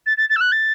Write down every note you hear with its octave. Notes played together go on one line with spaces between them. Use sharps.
A6
A6
A6
E6
F#6
A6